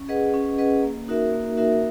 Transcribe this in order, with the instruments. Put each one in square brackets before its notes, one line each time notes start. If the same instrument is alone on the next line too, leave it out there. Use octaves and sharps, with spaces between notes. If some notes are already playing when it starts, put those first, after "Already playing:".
Already playing: [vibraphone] C#4
G#4 B4 D#5 F#5
C#4
G#4 B4 D#5 F#5
A#3
D#4 F#4 A#4 E5
A#3
D#4 F#4 A#4 E5